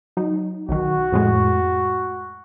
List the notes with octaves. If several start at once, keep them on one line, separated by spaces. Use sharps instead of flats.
F#3 D#4
B1 D#3 F#4
F2 A2 G#3